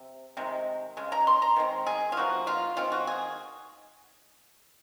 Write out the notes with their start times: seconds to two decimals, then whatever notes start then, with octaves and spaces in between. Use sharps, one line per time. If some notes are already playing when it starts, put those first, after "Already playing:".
Already playing: C3
0.37 C3 D#3 G#3
0.97 C#3 G#3
1.12 A#5
1.27 C6
1.42 A#5
1.56 D#3 G#3 C4
1.86 G#4
2.12 F4
2.17 C3 F3 A#3 F#4
2.47 F4
2.77 D#3 G#3 C4 F4
2.92 F#4
3.07 G#4